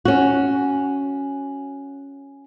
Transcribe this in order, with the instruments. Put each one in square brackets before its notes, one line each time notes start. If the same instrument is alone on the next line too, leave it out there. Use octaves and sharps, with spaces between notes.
[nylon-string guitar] C#4 F#4